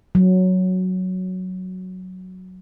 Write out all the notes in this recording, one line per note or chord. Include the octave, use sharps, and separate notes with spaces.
F#3